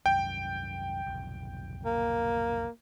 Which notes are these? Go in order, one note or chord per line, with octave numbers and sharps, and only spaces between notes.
C2 F#2 G5
F1 B1
A#3